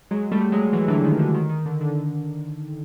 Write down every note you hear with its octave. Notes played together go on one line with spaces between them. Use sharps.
F#3 G#3
G3 A3
F#3 G#3
E3 F#3
D3 E3
D#3
D3
D#3
D#3
D3
D3